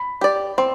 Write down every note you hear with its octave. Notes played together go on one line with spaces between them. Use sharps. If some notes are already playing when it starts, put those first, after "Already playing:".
Already playing: B5
G4 D5
C4 C6